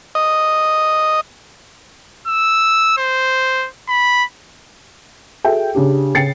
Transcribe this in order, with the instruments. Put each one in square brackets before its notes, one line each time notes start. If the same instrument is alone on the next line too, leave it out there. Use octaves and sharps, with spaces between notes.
[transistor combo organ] D#5
[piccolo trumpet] E6
C5
B5
[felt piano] F#4 G#4 A4 E5 G5
C#3 D4 G4
C#3 G5 A6 C7 C#7